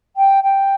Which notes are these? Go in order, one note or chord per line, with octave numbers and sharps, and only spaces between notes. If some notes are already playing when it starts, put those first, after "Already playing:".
G5
G5